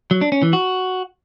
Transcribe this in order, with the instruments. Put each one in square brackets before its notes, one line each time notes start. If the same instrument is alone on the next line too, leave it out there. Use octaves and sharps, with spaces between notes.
[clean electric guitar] F#3
D4
C#4
E3
F#4